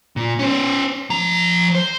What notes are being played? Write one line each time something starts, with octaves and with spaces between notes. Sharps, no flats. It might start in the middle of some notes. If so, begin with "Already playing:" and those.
A#2
C#4 C5
F3 A#5
C5